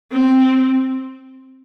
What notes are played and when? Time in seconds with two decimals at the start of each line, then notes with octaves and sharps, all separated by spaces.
0.13 C4